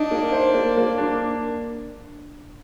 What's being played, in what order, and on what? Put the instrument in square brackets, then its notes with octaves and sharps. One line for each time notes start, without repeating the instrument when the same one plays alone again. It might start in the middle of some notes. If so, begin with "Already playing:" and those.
Already playing: [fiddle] D4 [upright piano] D#4
[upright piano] A#3
C5
A#3
A#3
D4